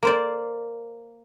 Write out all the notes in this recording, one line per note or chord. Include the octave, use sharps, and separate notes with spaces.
A#3 C5 D5